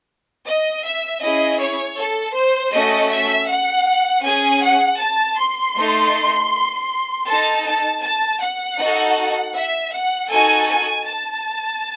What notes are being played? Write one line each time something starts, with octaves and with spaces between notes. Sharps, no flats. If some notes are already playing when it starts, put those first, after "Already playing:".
D#5
E5
C#4 E4 G#4 D#5
C#5
A4
C5
A3 C#4 F#4 A4 D#5
E5
F#5
C#4 G#4 G#5
F#5
A5
C6
A3 D#4 A4
D#4 A4 A5
A5
A5
F#5
D#4 F#4 A4
E5
F#5
D#4 F#4 A4 G#5
G#5
A5